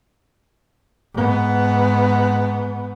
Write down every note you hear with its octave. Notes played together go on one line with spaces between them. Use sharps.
G#2 B3